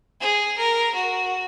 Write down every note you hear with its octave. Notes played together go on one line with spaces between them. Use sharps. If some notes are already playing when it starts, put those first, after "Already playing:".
G#4
A#4
F#4